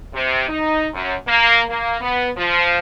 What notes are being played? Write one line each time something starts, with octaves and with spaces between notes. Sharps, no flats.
C3
D#4
F#2
A#3
A#3
B3
F3